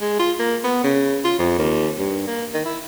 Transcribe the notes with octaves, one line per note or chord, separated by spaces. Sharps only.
G#3
F4
A#3
B3
C#3
F4
F2
D#2
G2
A#3
D#3
E4